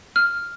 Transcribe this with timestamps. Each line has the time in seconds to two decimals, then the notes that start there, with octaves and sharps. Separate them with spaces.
0.16 F6